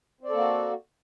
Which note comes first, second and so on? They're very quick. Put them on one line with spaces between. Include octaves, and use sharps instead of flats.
C4 D5 A4 A#3 F#4